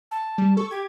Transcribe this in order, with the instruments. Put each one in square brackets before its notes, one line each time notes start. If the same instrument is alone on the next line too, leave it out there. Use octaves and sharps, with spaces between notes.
[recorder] A5
[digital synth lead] G3
[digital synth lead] A4 [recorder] C#6
[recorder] G4 [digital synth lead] G#6